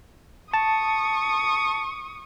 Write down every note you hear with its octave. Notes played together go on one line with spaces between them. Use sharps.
A5 C#6 D#6